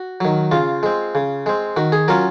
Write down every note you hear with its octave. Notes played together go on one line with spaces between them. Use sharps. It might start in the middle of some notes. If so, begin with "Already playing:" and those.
Already playing: F#4
D#3 F#3
C#3 F4
G#3 C4
C#3
G#3 C4
D#3 F#4
G#4
F#3 C#4 F4 A#4